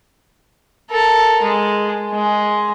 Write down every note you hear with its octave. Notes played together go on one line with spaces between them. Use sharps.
A4 A#4
G#3
G#3